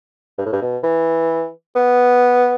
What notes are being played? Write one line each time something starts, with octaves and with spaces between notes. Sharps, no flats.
G2
A2
G2
B2
E3
B3